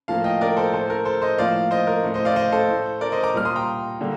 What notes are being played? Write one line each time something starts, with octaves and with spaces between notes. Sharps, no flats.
A2 F3 A#3 F5 A5
D#5 G5
A#4 D5
A4 C5
A2 A3 A4 C5
A#4
A4 C5
C5 D#5
A2 F3 A#3 D5 F5
C5 D#5
A#4
A2 A3
C5 D#5
D5 F5
C5 D#5
A4 C5
A2 A3
A#4 D5
C5 D#5
A#5 D6
A#2 G3 A#3 F6
C6 D#6
G5 A#5
D3 G3 A#3